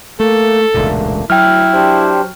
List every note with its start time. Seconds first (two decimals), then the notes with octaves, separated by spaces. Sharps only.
0.20 A3 A#3 A4
0.74 E1 C#2 A#2 A3 A#3 D4
1.30 D2 F#3 E4 G5 F6
1.73 D4 G4 C5